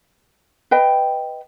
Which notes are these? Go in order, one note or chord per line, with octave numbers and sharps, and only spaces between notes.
B4 D#5 G5